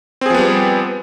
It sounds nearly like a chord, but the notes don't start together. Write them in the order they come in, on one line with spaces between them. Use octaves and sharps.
C4 G#4 F3 B3 G3